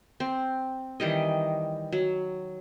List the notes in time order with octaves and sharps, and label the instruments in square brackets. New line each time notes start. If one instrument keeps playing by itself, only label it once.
[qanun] C4
D#3 E3 G3 D#5
F#3